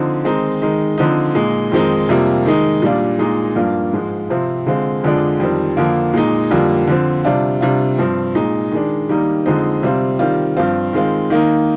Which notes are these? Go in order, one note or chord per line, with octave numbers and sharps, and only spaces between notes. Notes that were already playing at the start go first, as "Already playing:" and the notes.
Already playing: D3 F3 C4 D#4
D#3 G#3 C4 D#4
D#3 G#3 D#4
D3 F3 C4 D#4
A#2 G#3 D#4
F2 D#3 G#3 C4 D#4
F2 C3 G3 A#3 F4
D#3 G#3 D#4
A#2 G3 D4 F4
A#2 G#3 D#4
G2 F3 A#3 D4 F4
G#2 F3 G#3
C3 F3 C4 F4
D3 G#3 C4 F4
F2 D3 F3 G#3 D4
F2 D#3 G3 C4
F2 D3 F3 A#3
A#2 G#3 D#4
F2 D3 G3 A#3
D3 F3 C4
C3 G3 D4 F4
C3 G3 D4 F4
G2 F3 C4
A#2 G#3 D#4
D#3 G#3 D4
D#3 G3 A#3 D#4
F2 D3 G#3 C4 D#4
C3 G3 C4 F4
D#3 G3 C4 F4
G2 F3 C4 F4
D#3 G#3 C4 F4
D#3 A#3 D#4